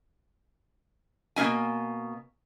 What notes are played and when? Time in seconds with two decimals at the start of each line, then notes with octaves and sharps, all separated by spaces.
1.36 B2 A#3 E4 G#5